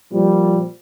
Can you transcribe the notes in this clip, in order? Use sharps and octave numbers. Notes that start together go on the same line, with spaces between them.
A#2 F3 G3